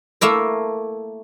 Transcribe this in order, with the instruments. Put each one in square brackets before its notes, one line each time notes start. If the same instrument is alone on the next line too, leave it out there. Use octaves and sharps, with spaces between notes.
[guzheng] A3 A#3 E4 A#4